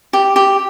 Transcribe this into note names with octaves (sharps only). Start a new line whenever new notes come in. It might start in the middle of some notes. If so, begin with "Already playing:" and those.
G4
G4